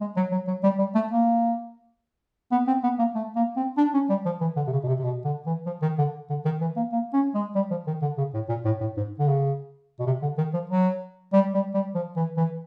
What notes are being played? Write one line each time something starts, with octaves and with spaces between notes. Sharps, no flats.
G#3
F#3
F#3
F#3
G3
G3
A3
A#3
B3
C4
B3
A#3
A3
A#3
C4
D4
C#4
G3
F3
E3
D3
C3
C#3
B2
C3
C3
B2
D3
E3
F3
D#3
D3
D3
D#3
E3
A#3
A#3
C#4
G#3
G3
F3
D#3
D3
C#3
A2
A#2
A2
A2
G#2
D3
C#3
B2
C3
D3
D#3
F3
F#3
G3
G3
G3
F3
E3
E3